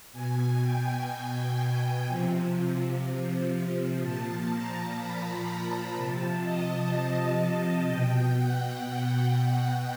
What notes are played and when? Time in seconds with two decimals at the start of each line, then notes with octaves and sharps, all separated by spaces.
0.12 B2 G#5
0.61 G5
2.07 C3 F3
4.01 A#2 F3 A5
4.50 A#5
4.98 B5
5.46 A#5
5.95 C3 F3 A5
6.43 D#5
7.88 B2 G5
8.37 F#5